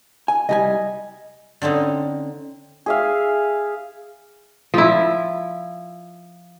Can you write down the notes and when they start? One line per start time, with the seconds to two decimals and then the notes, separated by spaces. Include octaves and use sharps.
0.28 G#5
0.49 C2 G3 D#5 G#5
1.62 D3 C4 C#4 D#4
2.86 G#4 E5 F5
4.74 F3 E4